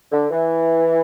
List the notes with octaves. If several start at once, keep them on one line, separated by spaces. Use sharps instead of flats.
D3
E3